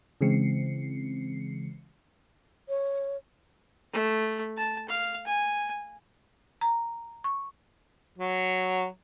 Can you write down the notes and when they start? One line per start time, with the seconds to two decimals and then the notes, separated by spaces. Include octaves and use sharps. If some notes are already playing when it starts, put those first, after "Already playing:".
0.21 C#3 E3 G#3 C4 C7 C#7
2.69 C#5
3.93 A3
4.57 A5
4.88 F5
5.26 G#5
6.61 A#5
7.24 C#6
8.18 F#3